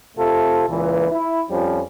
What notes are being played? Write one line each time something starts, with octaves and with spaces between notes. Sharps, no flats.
C3 A3 F4 A4
C#2 A#2 E3
E4
F2 F3 G3 C#4